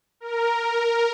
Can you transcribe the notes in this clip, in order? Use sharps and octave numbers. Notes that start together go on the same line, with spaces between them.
A#4